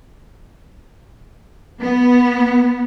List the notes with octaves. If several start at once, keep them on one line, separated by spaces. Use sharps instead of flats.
B3